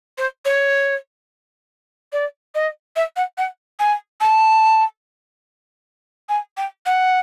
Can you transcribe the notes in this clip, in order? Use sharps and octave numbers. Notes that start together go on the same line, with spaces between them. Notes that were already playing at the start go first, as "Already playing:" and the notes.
C5
C#5
D5
D#5
E5
F#5
F#5
G#5
A5
G#5
G5
F#5